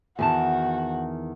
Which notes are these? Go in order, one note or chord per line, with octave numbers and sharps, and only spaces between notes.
E2 D#3 F#4 A5